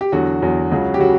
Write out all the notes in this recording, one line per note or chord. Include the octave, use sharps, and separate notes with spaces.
G4
E2 D3 F#3 F#4
E2 D3 F#3
C#2 C#3 F#3
G4
C#3 F#3 F#4